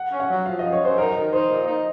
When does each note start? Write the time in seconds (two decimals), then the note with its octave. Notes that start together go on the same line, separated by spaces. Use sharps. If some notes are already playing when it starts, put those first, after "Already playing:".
Already playing: F#5
0.11 C#4
0.20 F#5
0.29 F#3
0.46 F3 F5
0.59 F#2 D#5
0.72 C#5
0.81 F#2 C5
0.98 D#4 A#4
1.15 D#3 A#4
1.33 D#4 C5
1.51 A#2
1.67 D#4